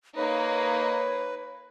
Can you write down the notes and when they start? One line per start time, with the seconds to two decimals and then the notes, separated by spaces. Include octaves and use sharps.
0.16 A#3 D#4 B4 C#5